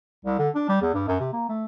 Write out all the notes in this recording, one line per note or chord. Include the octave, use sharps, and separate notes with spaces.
C2
D3
D4
G3
E2
G2
F#2
C3
A#3
A3